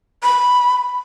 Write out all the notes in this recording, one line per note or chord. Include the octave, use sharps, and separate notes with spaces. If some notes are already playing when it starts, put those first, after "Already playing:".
B5